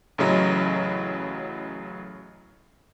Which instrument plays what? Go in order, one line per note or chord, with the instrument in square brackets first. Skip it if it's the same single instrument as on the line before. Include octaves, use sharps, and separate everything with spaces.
[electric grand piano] A1 A2 C#3 F#3 D#5 A#5